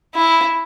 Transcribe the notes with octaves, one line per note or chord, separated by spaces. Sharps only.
E4